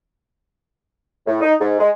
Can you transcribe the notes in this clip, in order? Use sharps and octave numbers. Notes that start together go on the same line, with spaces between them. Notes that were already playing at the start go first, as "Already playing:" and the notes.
A2
D#4
G#2
G#3